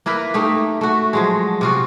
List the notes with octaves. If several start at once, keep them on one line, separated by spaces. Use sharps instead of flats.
A#3 E4 A#4 B4
A3 D#4 G4
A3 F#4
F3 F#3 G#3
C3 F4 F#4